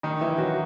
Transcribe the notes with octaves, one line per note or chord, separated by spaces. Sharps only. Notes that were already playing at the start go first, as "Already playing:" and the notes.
D#3 D#4
E3 E4
F#3 F#4